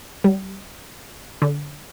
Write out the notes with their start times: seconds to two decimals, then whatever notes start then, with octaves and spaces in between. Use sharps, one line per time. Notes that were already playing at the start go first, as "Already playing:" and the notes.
0.24 G3
1.42 D3